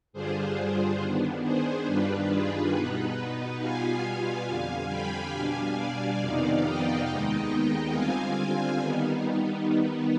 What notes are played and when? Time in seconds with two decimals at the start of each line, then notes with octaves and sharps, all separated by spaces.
0.13 G2 D3 G3 D4 F4 G#4 C5
0.99 D#3 B3 D4
1.43 G#4 C5
1.86 G2 D#3 G3 D4 F4 B4
2.29 G#4
2.72 B2 B3 D#4 B4
3.59 B2 G3 B3 F4 F5 G#5
4.46 F2 D3 G3 F5 G#5
4.89 G5 B5
5.32 B2 G3 D4 F5 G#5
5.75 D5 F5
6.19 F2 C3 D#3 B3 D#4
6.63 D#5 G5
7.05 D#2 D#3 G#3 B3 D#4 D#5 G5
7.92 D3 G3 C4 F4 F5 G#5
8.79 D#3 G3 B3 D#4